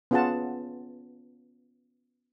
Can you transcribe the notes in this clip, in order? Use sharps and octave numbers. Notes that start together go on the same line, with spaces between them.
B3 C#4 F4 G#4 F#5 A5